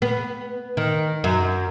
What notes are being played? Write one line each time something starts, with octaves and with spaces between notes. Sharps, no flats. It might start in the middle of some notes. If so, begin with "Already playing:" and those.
B3
D#3
F#2